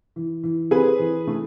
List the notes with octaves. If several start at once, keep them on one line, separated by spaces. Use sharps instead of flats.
E3
E3
C4 G#4 B4
E3
A3